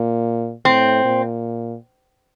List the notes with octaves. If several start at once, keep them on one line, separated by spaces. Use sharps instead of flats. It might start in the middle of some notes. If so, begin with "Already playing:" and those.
Already playing: A#2
A2 C4
A#2